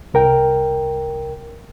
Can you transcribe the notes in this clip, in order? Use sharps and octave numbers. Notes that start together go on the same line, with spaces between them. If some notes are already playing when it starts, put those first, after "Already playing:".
C2 A#4 G5